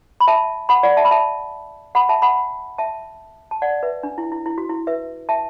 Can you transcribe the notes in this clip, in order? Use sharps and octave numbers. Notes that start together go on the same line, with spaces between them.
B5
E5 A5
F#5 B5
D5 F#5
E5 A5
B5
E5 A5
F#5 B5
E5 A5
F#5 B5
E5 A5
A5
D5 F#5
B4 E5
D4
E4
E4
E4
F#4
E4
B4 E5
E5 A5